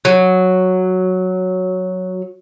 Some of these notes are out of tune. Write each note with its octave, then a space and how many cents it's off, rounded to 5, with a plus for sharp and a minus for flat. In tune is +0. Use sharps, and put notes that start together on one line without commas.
F#3 -5